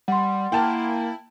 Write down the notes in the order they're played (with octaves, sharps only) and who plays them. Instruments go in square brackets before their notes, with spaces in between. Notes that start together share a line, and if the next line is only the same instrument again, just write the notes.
[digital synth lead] G3 [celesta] F#5 C6
[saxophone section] A#3 [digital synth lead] E4 [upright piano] G5 A5